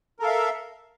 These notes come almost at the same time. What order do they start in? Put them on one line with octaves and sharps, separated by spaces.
A#4 A4 F5 E5